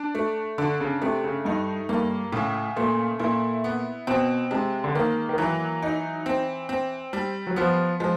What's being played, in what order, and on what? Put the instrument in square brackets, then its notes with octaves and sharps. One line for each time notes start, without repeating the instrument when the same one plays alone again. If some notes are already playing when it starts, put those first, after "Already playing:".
Already playing: [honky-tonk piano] D4
A3
[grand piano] D3 [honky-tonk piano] D4
[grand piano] C#3
[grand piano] C3 [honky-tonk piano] A3
[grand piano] C#3
[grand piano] G2 [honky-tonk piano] D#4
[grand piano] G2 [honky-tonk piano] A#3
[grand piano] A2 [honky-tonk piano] C#3
[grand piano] A#2 [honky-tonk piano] A3
[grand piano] A#2 [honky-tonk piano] E4
[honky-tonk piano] B3
[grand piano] B2 [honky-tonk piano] C4
[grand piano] C3 [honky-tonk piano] G#3
[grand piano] D3
[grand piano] D#3 [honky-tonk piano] A#3
[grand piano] D#3
[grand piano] E3 [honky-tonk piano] F#3
[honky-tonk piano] D#4
C4
C4
G3
[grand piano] F#3
[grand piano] F3 [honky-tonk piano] B3
[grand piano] F3 [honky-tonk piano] G#3